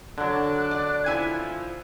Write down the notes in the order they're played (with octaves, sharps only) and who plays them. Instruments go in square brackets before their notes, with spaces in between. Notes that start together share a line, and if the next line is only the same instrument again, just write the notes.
[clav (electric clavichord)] D3 F#3 [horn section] D4 [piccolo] F#6
[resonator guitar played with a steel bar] D5
[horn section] F3 [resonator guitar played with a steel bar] E4 G#5